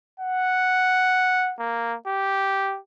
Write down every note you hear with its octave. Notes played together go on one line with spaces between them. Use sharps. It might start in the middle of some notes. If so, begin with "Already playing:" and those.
F#5
A#3
G4